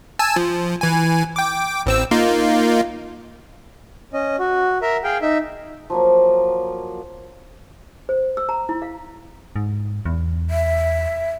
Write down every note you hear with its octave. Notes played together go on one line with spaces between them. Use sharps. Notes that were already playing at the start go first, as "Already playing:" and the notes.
G#5 A5 E6
F3
E3 G#5
G5 D6
A1 C4 E6
A#3 D#4 F4
C#4 D#5
F#4
A#4 E5
G#4 F5 G5
D#4 E5
F3 F#3 A#3
C5
E6
A#5
E4
F5
G#2
E2
E5